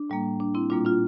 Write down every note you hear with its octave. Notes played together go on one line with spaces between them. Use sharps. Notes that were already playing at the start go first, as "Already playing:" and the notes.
Already playing: D4
A2 G3 A#3
D4
C4 E4
A#2 G3 A#3 D4 F4
D4 F4